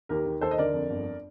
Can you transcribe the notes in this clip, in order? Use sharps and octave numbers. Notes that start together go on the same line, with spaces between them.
D#2 G4 A#4
D#2
D#2 A4 C5
D#5
D3 A#4 D5
F2
G1